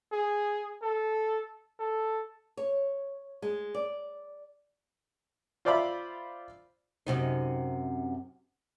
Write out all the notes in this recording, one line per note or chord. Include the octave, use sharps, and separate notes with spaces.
G#4
A4
A4
C#5
G#3
D5
F4 C5 D5 E5 F5 B5
F#2 C3 D#4